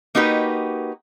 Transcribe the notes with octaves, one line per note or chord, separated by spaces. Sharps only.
A#3 D#4 F#4 G4 B4